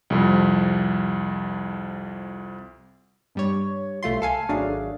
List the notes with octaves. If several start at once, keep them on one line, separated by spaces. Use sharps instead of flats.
C2 F2
G2 G3 C#5
C2 A3 F4 C6
A4 F5 G#5
G#1 F#3 A3 D4 G#4 F5